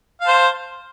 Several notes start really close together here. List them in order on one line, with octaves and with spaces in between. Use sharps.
F5 A5 C5